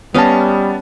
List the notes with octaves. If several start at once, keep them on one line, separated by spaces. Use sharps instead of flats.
G3 B3 C#4 D#5 F5 A5